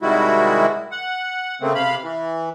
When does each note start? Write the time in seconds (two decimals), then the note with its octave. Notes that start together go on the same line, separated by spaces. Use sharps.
0.02 C3 D#3 G3 G#3 E4 F#4
0.91 F#5
1.62 C#3 A3 A#3 C4
1.75 C3 F5 B5
2.03 E3